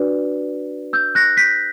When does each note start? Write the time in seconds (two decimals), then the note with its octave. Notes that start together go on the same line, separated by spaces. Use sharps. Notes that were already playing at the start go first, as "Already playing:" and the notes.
Already playing: D4 F#4 B4 D5
0.93 E6 G6
1.15 F#6 A#6
1.37 G6 B6